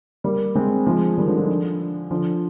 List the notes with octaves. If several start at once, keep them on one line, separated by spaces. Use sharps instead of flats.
G3 A#3
G#3 C4
F3 G#3
D#3 G3
D3 F3
D3 F3
D3 F3